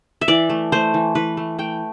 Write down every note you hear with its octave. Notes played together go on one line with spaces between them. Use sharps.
E5
E3 D5
A3
A3 C5
E3
E3 B4
A3
A3 G5